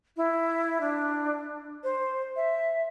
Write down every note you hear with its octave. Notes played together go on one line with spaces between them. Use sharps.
E4
D4
C5
E5